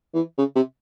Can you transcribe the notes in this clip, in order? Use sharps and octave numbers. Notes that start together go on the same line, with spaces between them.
E3
C#3
C3